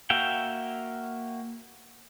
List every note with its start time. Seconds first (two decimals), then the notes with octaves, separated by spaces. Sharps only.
0.10 A#3 F#4 E5 F5 G5